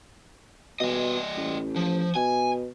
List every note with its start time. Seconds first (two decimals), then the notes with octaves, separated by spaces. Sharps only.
0.80 B2 G3 D#5
1.37 A1
1.76 F3
2.15 B2 G#5